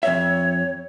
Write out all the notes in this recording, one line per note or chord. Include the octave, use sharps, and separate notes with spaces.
F2 C#5 E5